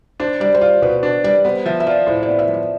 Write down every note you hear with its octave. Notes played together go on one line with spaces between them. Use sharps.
D4 C5
G3 D5
C5
F4 D5
B2 B4
D4 C5
G3 D5
B3 C5
F3 E5
E5
F4 D5
A2 C5
D5
B3
E5
F3
D5